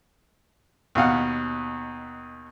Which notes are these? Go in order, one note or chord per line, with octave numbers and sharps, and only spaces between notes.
D#2 B2 F5 F#5